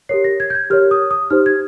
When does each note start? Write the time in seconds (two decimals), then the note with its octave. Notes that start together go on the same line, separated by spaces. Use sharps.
0.09 G4 A#4 C#5 C7
0.24 A#6
0.40 G#6
0.50 G6
0.55 G#6
0.70 G4 A#4 C#5 F6
0.91 D#6
1.11 D#6
1.30 D#4 G4 C5 F6
1.46 G#6